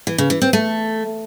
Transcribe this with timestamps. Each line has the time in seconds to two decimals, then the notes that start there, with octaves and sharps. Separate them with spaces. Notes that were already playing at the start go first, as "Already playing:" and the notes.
0.07 E3
0.18 C#3
0.30 E3
0.42 C4
0.53 A3